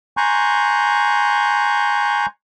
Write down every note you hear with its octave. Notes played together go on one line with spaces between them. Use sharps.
G#5 A#5 C6 C#6 F#6 G6